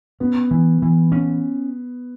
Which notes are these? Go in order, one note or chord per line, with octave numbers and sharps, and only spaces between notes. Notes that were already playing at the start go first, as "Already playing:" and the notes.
B3 C#4
E3
E3
C#4